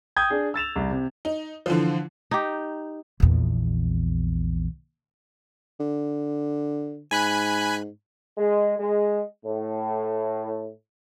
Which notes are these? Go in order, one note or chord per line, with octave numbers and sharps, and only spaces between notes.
G5 D#6 G6 G#6
D4 G#4
E6 A6 E7 F7
C2
C3
D#4
D3 E3 F3
D#4 G4
A#1 E2
D3
G#2 G#5 B5 F#6
G#3
G#3
A2